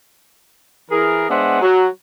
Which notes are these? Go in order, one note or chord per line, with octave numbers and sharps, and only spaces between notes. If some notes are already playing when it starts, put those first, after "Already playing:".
E3 G#4 A#4
G#3 B3 D4 C5 E5 F#5
F#3